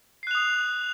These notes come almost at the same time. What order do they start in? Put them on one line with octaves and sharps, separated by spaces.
C7 F#6 F7 D#6